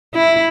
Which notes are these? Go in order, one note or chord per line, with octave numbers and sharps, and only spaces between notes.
E4